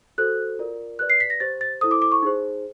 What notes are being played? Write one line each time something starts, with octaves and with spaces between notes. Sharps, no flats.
F#4 A4 C5 F#6
F4 A#4 D5
G4 B4 D5 F#6
C7
B6
A#6
G4 C5 A6
A6
E4 A4 C5 D#6
D6
D6
C#6
D#4 G#4 C5